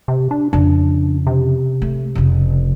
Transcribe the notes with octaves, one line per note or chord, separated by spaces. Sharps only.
C3
D4
F2 C#3 D4
C3
A3
F1 C#3